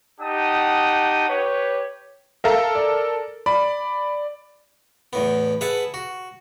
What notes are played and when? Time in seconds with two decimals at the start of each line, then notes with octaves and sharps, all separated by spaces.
0.20 D#4 G4 F#5 A5 D#6
1.29 G4 B4 C#5
2.44 A4 A#4 E5 F5 A#5
2.75 D5
3.46 D5 B5
5.13 E2 A2 B3
5.61 G#4 B4 E5 F#5 A5
5.94 F#4